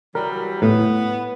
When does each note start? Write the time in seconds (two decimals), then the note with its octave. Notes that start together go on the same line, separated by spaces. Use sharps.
0.15 E3 F#3 G3 A#4
0.62 A2 B3